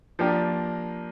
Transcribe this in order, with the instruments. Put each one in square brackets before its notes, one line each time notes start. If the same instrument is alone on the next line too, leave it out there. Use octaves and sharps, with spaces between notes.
[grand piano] F3 A#3 D4 G4 A#4